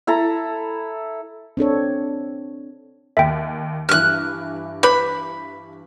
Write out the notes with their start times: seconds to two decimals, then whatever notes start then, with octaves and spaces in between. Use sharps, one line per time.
0.07 E4 A4 A#5
1.57 C4 D4 A4 C#5
3.17 D#2 E5 G5
3.89 G2 E3 F6 F#6
4.83 B4 B5 D6 G6